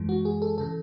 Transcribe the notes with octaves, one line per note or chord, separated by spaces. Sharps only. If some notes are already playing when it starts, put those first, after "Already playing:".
Already playing: F#2 E3 G#3
F#4
G#4
A4
C#3 E3 A4